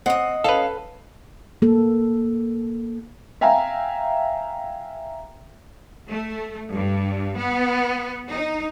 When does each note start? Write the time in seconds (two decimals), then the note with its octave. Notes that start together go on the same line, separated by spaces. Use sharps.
0.06 C4 D#5 F#5 D#6
0.44 C#4 A4 B4 F5
1.62 A#3 A4
3.41 E5 F5 G5 G#5 A#5
6.10 A3
6.74 G2
7.38 B3
8.30 D#4